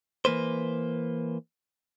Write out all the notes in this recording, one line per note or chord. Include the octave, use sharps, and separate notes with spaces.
E3 A#3 B4 C5